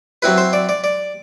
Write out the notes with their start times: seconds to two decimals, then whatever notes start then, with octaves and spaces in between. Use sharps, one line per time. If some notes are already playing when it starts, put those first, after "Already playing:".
0.22 F#3 C4 E4 B4
0.38 C5
0.53 D5
0.69 D5
0.84 D5